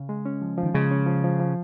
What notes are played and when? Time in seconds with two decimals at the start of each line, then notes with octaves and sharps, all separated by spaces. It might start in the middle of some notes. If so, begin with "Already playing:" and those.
Already playing: C#3
0.09 G#3
0.26 C#4
0.42 F3
0.58 F3
0.63 D#3
0.74 C#3 G#3
0.91 C#4
1.07 F3
1.24 F3
1.40 F3